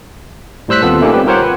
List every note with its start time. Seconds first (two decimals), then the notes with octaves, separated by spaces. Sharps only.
0.68 A2 G3 C5 E6 F#6 B6
0.82 D#2 B3 C4 F4 A4 E6
1.01 A3 A#3 C#4 D#4 G4 A4
1.13 G3 C4 G4 B4
1.26 F4 G4 A#4 C5 C#5 F#5
1.42 B4